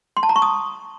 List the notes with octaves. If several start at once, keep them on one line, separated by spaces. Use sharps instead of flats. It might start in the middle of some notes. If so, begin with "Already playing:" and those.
C6
A5
A#5
C#6
D#6